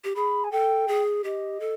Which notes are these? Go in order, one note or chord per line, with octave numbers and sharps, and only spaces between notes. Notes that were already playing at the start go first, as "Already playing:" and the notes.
G4
G#4 B5
G#5
A4 G5
G#4
G4 D#5
A4